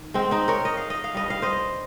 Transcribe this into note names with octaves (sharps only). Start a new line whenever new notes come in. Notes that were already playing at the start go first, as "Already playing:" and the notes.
Already playing: D#3
G#3 C4
C4 D#4
A#4 C#5
D#5
F5
D#5
F5
G2 G3 D#5
F5
C5 D#5